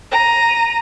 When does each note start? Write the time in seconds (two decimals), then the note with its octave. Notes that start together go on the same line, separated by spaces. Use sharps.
0.11 A#5 D#7